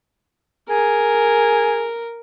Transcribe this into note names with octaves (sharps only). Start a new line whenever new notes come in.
G#4 A#4